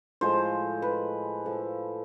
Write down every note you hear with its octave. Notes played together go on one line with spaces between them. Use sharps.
A2 F3 G#3 C5
B4
A2 F3 A3